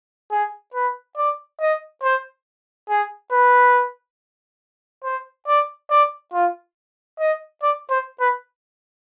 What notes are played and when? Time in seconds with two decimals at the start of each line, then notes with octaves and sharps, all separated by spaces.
0.31 G#4
0.74 B4
1.17 D5
1.60 D#5
2.03 C5
2.89 G#4
3.32 B4
5.04 C5
5.47 D5
5.90 D5
6.33 F4
7.20 D#5
7.62 D5
7.91 C5
8.20 B4